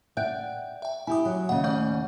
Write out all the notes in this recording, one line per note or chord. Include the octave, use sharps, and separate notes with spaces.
D5 E5 F#5 G5
E5 G5
E4 G4 G#5 D#6
F#3
D#2 C#3 F#5
A3 D5 F#5